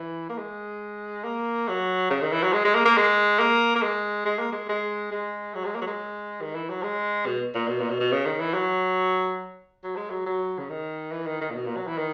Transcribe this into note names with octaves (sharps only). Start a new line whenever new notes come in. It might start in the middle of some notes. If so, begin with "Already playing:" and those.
Already playing: E3
A#3
G#3
A#3
F#3
C#3
D#3
E3
F#3
G#3
G#3
A#3
A#3
G#3
A#3
A#3
G#3
G#3
A#3
G#3
G#3
G#3
F#3
G#3
A#3
F#3
G#3
D#3
E3
F#3
G#3
B2
A#2
B2
A#2
B2
B2
C#3
D#3
E3
F#3
F#3
G#3
F#3
F#3
C#3
D#3
E3
D#3
D#3
A#2
B2
A#2
F#3
E3
D#3